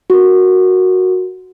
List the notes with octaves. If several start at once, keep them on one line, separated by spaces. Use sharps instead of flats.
F#4 A#4